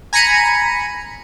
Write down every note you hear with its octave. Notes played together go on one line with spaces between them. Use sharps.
G#5 A#5 B5 C#7 D#7